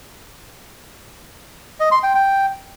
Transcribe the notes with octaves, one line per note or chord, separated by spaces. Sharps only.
D#5
C6
G5
G5